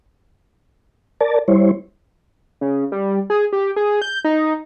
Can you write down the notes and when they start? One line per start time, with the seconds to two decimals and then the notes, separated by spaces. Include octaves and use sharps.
1.21 A#4 D5 A5
1.48 G3 E4 C5 C#5
2.61 C#3
2.92 G3
3.30 G#4
3.53 G4
3.76 G#4
4.02 G6
4.24 D#4